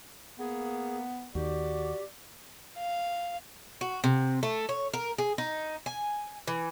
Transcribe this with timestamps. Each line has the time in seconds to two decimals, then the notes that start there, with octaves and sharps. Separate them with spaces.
0.39 A#3 B3 G#4
1.35 D#2 D#3 F#4 G4 D5
2.78 F5
3.81 F#4
4.04 C3
4.43 A3
4.69 C#5
4.94 A#4
5.18 G#4
5.38 D#4
5.86 G#5
6.48 E3